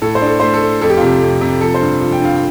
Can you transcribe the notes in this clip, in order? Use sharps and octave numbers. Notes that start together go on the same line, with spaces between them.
A2 A4
C5
D4
A4
A3 C5
A4
A3
F2 A4
G4
F4
C3 G4
F2
C3
F3 A4
C5
G2
F3
G5
G2 F5
G5